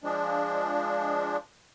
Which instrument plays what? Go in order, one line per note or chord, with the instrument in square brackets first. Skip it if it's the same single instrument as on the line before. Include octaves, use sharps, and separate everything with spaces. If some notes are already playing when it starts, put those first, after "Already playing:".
[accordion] F3 G#3 D4